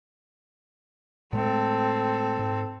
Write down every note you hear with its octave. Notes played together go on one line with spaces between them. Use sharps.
A2 G#3 A3 C4 A4
G#2